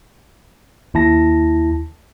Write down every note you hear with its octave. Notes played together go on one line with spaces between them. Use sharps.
D#2 E4 A5 A#6